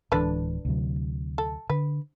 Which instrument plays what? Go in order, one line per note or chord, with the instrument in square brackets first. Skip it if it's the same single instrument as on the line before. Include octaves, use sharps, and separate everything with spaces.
[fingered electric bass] D1 E3 G#3 [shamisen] D3 D4 B4
[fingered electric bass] D2 C3 F#3
[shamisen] A4
[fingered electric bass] D3 [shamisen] B4